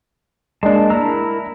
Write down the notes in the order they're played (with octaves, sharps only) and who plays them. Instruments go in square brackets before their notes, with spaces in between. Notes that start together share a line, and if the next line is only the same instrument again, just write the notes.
[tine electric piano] G#3 D4 [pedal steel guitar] A#3 A5
[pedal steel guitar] E4 A#4 E6 [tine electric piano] A#5